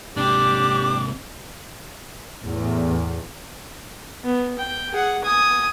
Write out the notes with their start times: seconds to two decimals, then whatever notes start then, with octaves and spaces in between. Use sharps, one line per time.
0.17 G#2 C3 D4 G4 D6
2.42 E2 A2
4.24 B3
4.59 G5
4.93 G#4 F#5
5.24 G#5 D#6